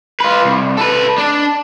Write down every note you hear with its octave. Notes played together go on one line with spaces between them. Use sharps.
F4 B4
C2
A4 B4
D4